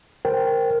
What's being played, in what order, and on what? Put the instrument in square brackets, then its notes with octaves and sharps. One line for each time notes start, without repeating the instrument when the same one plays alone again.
[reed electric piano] A#4 C5 G5